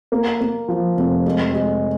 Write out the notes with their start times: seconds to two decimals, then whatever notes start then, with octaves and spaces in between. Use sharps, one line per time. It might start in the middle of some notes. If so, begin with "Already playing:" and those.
0.12 A#3
0.41 A#3
0.68 F3
0.97 F1
1.26 G#3
1.54 G#3